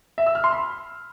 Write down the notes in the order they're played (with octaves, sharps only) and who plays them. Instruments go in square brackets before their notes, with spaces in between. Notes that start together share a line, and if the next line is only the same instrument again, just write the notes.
[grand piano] E5
E6
F6
C6
B5